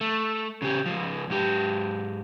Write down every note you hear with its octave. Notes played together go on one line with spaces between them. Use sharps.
A3
C#3 G4
C#2 F3
G#2 G4